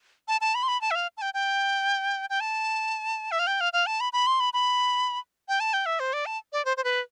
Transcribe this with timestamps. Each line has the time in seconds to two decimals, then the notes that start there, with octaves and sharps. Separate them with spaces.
0.28 A5
0.41 A5
0.55 B5
0.63 C6
0.68 B5
0.81 A5
0.91 E5
0.95 F5
1.17 A5
1.22 G5
1.34 G5
2.30 G5
2.40 A5
3.31 E5
3.39 F5
3.47 G5
3.61 F5
3.73 F5
3.87 A5
4.00 B5
4.13 B5
4.27 C6
4.40 B5
4.53 B5
5.48 G5
5.60 A5
5.73 G5
5.86 E5
6.00 C5
6.13 D5
6.26 A5
6.53 D5
6.65 C5
6.77 C5
6.84 B4